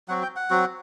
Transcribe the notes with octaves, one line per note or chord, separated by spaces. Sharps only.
F#3 C4 F#4 F#5
G5
F#5
F#3 C4 F#4